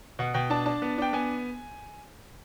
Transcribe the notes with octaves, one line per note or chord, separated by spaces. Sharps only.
B2 F#5
B2 G5
D4 A5
D4 A5
B3
D4 G5
B3 G#5